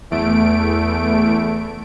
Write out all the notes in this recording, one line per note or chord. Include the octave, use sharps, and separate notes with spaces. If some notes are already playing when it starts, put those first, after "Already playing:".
E2 A3 D7